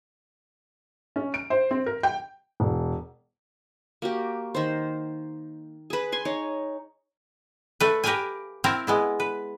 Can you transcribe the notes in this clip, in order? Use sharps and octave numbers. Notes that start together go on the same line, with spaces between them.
C#4
D7
C5
C4
A#4
G5
E1
A#3 F#4 G4
D#3 C5
G#4 B4
G#5 C6
D#4 C#5
A3 B4
G4 A#4 B4 F5 G5 G#5
C4 E4 A#4 F5 A5
G#3 B3 E4
B4